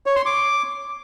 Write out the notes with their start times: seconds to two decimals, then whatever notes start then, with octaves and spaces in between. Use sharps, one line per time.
0.06 C#5
0.16 C6
0.26 D6